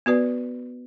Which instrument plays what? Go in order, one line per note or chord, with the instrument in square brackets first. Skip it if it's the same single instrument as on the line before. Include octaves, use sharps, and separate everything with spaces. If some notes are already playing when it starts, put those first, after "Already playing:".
[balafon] B3 F#4 B4 D5